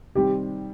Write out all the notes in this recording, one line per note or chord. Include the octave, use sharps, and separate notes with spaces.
C3 D#3 G3 C4 G4